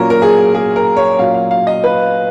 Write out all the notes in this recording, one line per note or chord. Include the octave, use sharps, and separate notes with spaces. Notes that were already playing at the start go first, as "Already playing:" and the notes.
Already playing: A#2 F#3 A#3 C#4 A#4
A#4
G#4
G#4
A#4
C#5
A#2 F#3 C#4 F5
F5
F5
D#5
B4